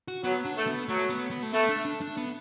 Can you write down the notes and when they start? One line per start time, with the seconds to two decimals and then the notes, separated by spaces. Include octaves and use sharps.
0.08 F#4
0.23 F#3 B3
0.45 D4
0.56 A3
0.67 B3
0.88 F#3 A3
1.10 B3
1.31 B3
1.43 A3
1.53 A3 B3
1.69 D4
1.85 D4
2.02 D4
2.17 B3